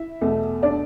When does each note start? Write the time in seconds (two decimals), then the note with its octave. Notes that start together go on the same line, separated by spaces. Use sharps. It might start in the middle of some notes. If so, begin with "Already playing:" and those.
Already playing: E4 E5
0.21 E2 B2 A3
0.62 D4 D5